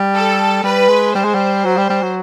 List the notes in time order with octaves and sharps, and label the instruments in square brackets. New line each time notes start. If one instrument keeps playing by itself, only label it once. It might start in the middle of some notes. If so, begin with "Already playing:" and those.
Already playing: [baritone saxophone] G3
[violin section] A4
[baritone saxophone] G3 [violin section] B4
[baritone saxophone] G#3
[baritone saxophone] G3 [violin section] C5
[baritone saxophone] G#3
G3
F#3
G3
G3
F#3